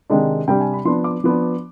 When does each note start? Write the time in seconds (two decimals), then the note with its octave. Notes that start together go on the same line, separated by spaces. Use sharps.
0.10 C3 D#3 G#3 D4
0.48 C3 G3 D4 G5
0.61 G#5
0.73 B5
0.85 F3 B3 D4 C6
1.04 D6
1.24 F3 B3 D4